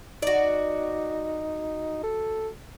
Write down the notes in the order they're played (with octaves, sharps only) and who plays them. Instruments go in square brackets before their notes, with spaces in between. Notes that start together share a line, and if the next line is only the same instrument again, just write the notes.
[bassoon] D#4 [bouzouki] F#4 D5
[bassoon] A4